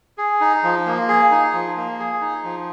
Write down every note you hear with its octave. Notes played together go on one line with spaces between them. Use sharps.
G#4
D#4
F3
A#3
G#4
D#4
F3
A#3
G#4
D#4
F3